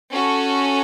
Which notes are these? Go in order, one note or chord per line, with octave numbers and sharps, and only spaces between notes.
C#4 F#4 A4